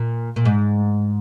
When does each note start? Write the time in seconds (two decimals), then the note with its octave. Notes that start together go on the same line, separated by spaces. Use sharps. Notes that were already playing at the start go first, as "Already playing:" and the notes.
Already playing: A#2
0.36 A#2
0.45 G#2